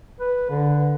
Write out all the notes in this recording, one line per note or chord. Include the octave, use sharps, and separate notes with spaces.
B4
D3